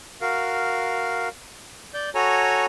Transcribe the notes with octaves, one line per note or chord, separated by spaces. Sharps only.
F#4 A#4 F5
D5 G6
F#4 A4 C#5 G#5 A#5